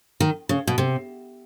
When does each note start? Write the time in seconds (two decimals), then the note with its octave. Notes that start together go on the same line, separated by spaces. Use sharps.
0.20 D#3
0.49 C#3
0.67 B2
0.78 C3